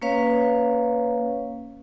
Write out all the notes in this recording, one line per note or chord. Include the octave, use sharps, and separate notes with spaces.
A#3 C#4 B4 C#5 F5